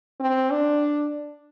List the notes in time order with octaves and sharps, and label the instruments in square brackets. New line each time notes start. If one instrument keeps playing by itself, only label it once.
[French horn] C4
D4